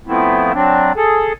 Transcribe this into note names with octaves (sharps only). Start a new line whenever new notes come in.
F3 A3 B3 C4 E4
F#3 C4 D4
G#4 A4